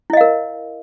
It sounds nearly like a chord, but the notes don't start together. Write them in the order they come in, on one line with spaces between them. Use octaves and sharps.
E4 D#5 F5 A#4